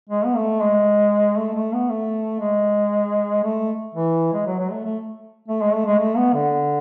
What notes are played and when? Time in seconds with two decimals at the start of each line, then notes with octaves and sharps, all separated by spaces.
0.10 G#3
0.25 B3
0.36 A3
0.61 G#3
1.37 A3
1.55 A3
1.73 B3
1.89 A3
2.40 G#3
3.43 A3
3.95 E3
4.33 G#3
4.46 F#3
4.59 F#3
4.71 A3
4.84 A3
5.48 A3
5.61 G#3
5.73 A3
5.86 G#3
5.99 A3
6.16 B3
6.33 D3